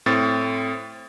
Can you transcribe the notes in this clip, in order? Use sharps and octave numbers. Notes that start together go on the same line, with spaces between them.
A2 C4 A6